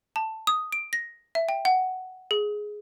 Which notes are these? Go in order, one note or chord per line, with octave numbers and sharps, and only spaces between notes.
A5
D#6
D7
A#6
E5
G5
F#5
G#4